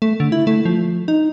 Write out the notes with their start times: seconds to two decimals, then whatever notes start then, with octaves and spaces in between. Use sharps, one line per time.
0.02 A3
0.20 D3
0.32 E4
0.47 A3
0.65 F3
1.08 D#4